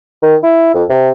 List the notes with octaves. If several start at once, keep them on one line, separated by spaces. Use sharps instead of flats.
D#3
E4
F2
C3